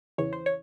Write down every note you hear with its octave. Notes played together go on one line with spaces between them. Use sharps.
E2 C#3 E3 C#5
C5
C#5